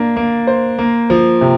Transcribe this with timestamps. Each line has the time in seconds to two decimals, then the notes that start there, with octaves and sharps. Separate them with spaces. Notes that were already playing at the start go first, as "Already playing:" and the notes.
Already playing: A#3 D4
0.16 A#3
0.47 C5
0.78 A#3
1.10 F3
1.41 C3